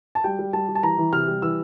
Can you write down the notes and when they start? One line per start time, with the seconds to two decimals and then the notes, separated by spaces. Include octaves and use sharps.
0.15 A5
0.24 G3 G5
0.39 G3
0.53 G3 A5
0.69 G3
0.75 A5
0.83 E3 A#5
0.98 E3
1.13 C3 F6
1.28 G3
1.42 E3 E6